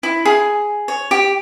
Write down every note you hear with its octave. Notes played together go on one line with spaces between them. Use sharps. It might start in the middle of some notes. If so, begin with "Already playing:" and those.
E4
G#4
C#5
G4